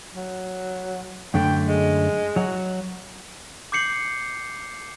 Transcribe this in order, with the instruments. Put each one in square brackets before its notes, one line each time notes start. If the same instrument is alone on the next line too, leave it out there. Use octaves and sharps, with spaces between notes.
[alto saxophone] F#3
[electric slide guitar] F#2 D3 A3 [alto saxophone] G5
[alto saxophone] G#3
[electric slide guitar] F#3 F#4
[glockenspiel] D6 G6 C7 C#7 F#7